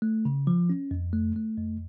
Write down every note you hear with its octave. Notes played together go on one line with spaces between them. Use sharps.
A3
C#3
F3
C#4
F2
A3
A3
F2